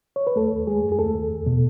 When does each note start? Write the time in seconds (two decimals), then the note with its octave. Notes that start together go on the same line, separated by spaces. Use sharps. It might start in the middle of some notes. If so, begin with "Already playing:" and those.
0.16 C#5
0.27 B4
0.36 D#2 A3 A4
0.52 D#2
0.67 G#3 G#4
0.84 F#2
0.92 G#4
0.99 D#2 A3 A4
1.15 D#2
1.30 E2
1.46 B2